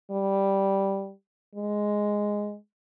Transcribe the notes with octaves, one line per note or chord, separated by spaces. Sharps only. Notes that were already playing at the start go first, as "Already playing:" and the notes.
G3
G#3